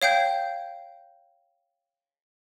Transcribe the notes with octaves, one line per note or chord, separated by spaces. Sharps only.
C#5 F5 G5 G6